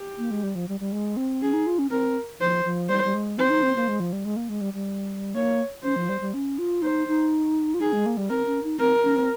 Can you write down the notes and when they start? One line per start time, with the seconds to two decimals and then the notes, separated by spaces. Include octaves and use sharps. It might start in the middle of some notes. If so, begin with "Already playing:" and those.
Already playing: G4
0.18 A#3
0.31 G#3
0.43 G3
0.55 F3
0.69 G3
0.80 G3
0.92 G#3
1.17 C4
1.42 C#4 G#4
1.53 D#4
1.67 F4
1.79 C#4
1.90 C4 A#4
2.40 F3 C5
2.65 F3
2.89 G3 C5
3.05 G3
3.14 G#3
3.38 C4 C5
3.50 D#4
3.63 C4
3.76 A#3
3.88 G#3
4.00 F3
4.13 G3
4.25 G#3
4.36 A#3
4.49 G#3
4.61 G3
4.74 G3
5.34 A#3 C#5
5.84 C#4 C5
5.96 F3
6.09 G3
6.21 G3
6.34 C#4
6.59 F4
6.82 D#4 C5
7.08 D#4
7.74 F4
7.80 D#4 G#4
7.93 G#3
8.06 A#3
8.17 G3
8.29 C4 A#4
8.46 C#4
8.63 D#4
8.79 C4 A#4
9.04 C#4
9.16 C4